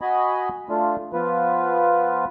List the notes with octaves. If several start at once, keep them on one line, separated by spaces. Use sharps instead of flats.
F#4 D#5 G#5 B5
A3 D4 F4
F3 B3 F4 B4